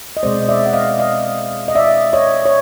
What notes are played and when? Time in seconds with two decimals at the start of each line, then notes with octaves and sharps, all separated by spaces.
0.17 D#5
0.23 B2 G#3 C4 C5 D5
0.42 D#5
0.49 D5 E5
0.66 F#5
0.73 D#5 F5
0.99 D#5 F5
1.68 D#5
1.75 D5 E5
2.13 C#5 D#5
2.46 C#5